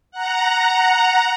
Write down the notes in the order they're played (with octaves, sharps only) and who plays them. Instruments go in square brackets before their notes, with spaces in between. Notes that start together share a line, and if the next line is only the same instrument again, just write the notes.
[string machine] F#5 A#5